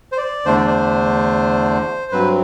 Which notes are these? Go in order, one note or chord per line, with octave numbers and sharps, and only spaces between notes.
C5
D5
E2 D3 A3 D4 C5
D5
C5
G2 F#3 C4 B4